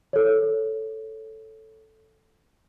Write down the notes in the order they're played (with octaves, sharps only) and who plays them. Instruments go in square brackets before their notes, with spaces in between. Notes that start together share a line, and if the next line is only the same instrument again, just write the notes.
[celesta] A4 C#5